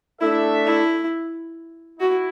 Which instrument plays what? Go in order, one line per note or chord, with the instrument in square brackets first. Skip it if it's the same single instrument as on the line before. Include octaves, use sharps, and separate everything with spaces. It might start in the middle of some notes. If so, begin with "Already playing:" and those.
[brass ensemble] A3 D4 A4 E5 [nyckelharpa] E4
[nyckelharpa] E4
[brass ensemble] E4 [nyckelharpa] F#4